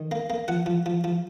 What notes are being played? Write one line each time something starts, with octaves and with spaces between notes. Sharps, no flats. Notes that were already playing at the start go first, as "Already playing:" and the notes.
Already playing: D#3
A#3
A#3
F3 F#5
F3
F3
F3